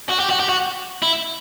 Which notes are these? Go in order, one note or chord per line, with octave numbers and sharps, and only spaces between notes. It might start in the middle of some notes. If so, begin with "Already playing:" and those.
F#4
G4
F#4
G4
F#4
E4